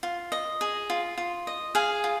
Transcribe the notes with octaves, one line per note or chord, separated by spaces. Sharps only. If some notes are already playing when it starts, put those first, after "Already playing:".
F4
D#5
G#4
F4
F4
D#5
G#4 F5 G#5
F4